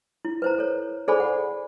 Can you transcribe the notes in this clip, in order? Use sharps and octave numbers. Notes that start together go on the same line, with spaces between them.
E4
B4 C5 A#5
A4 C#5
G#4 A4 C5 D5 G#5 B5
F#5